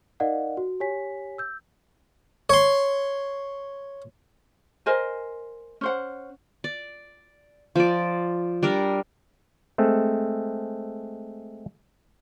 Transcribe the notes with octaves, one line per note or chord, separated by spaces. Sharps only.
D#4 A#4 D5 D#5 F5 F#5
F#4
G4 C#5 G#5 B6
E6 G6
C#5 C6
A#4 C5 D#5 G#5
C#4 C5 F#5
D5
F3 D5
G3 D4 A#4
G#3 A3 C4 A4